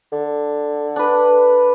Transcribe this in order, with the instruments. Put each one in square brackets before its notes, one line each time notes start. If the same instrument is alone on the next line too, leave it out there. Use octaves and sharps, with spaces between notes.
[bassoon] D3
[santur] D4 B4